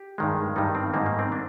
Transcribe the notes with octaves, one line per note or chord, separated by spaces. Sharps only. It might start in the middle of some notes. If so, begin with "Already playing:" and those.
Already playing: G4
G2 D#3 G#3
G2 D#3 G3 D#4
C4
G#2 D#3 G3 A#3
A#3
C4
D4